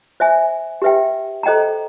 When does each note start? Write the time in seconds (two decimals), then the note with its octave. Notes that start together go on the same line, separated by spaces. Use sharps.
0.20 C5 E5 G#5
0.82 G4 B4 E5 G5
1.43 A4 C5 D#5 G5 A#5